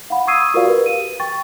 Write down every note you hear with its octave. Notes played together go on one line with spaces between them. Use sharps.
F5 F#5 B5
C#6 D#6 E6 G#6 C7 D#7
F4 F#4 A#4 C5 D5 F5
G4 A#4 B4 F5
D#7
G5 C#6 A6